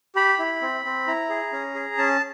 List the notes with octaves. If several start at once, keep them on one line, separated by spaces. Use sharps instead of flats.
G4 B5
E4
C4
C4
E4 A#5
G#4
C#4
G#4
C#4 A5